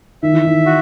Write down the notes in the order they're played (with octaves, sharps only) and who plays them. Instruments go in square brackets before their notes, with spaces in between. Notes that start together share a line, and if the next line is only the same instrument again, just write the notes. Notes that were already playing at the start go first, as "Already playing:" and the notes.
[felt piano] D#3 [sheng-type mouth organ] E5
[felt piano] E3
D#3
[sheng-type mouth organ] F#4